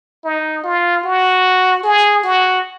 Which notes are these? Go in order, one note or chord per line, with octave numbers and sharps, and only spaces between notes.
D#4
F4
F#4
G#4
F#4